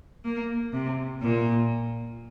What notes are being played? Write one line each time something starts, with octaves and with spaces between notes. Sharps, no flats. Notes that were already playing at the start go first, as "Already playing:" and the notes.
A#3
C3
A#2